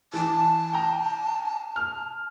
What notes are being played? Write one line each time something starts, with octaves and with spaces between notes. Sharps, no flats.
E3 A5
G5 A#5
F6